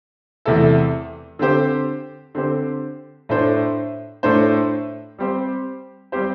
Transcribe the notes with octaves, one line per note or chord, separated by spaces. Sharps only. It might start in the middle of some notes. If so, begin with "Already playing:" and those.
E2 C3 A3 E4 A4
D3 C4 G4 C5
D3 C4 G4 C5
A2 A3 D4 C5
A2 A3 D4 C5
G3 C4 G4 C5
G3 C4 G4 C5